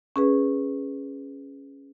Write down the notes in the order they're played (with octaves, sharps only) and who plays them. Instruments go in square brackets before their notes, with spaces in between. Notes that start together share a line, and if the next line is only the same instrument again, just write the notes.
[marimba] C#4 G#4 B4